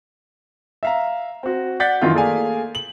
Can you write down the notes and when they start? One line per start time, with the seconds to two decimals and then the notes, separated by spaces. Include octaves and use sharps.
0.83 E5 F5 A#5
1.43 C4 F#4
1.80 D5 F#5 G6 A6 B6
2.01 F#2 D#3 E3 F4 C6
2.13 A3 A#3 G#4 D5 F5 G#5
2.75 F#7